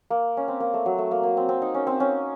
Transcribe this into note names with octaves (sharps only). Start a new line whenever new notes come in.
A#3
C#4
C4
A#3
A3
F#3
A3
A#3
A#3
C4
C4
D#4
C#4
C4
C#4